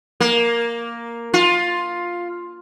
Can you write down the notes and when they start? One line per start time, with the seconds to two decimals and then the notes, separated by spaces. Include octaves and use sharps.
0.20 A#3
1.34 F4